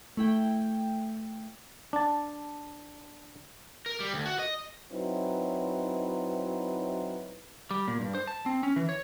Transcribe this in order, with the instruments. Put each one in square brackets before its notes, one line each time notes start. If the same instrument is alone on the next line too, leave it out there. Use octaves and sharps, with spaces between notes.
[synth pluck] A3 E4 G5
[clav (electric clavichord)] D4 A5
[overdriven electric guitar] A#4
G3
D2
F#4
D#5
[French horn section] F#3 C4 D#4 E4 B4
[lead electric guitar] G3
A#2
G2
C5
A5
C4
C#4
E3
C#5